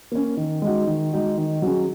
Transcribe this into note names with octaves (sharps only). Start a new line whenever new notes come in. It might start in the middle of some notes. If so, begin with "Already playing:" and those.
A#3 C#4
D#3
G#3 D#4 F#4
D#3
G#3 D#4 F#4
D#3
F#3 C#4 G#4